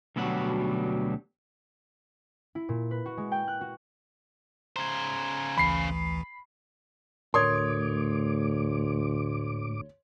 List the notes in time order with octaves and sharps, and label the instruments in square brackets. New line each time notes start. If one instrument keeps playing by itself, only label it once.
[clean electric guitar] D2 B2 F#3 G3 F#5
[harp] E4
A#2
B4
F#4
G#3
G5
F#6
F#4
[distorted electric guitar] C#3 C5 [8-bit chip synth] A#5 G#6
[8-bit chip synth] A1 D2 E3 [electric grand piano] B5 C7
[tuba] D2 [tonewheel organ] A2 D6 [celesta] A#4 D#6 G#6 [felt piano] C#5 C6